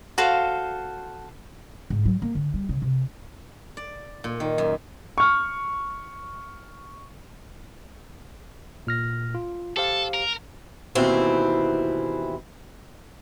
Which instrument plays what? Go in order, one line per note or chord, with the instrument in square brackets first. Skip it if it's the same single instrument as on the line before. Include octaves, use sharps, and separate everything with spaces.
[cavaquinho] F#4 A4 C5 F5
[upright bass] G#2
F#3
A#3
D3
G3
C#3
C3
[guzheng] D5
A#2
D#3
F#2
[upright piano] C#6 F6
[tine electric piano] A#2 F6 A#6
F4
[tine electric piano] G4 C5 F5 [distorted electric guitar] A4
[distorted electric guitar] A#4
[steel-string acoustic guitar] D#2 B2 E3 C4 E4